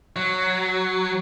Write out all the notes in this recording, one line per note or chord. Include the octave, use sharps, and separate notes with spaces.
F#3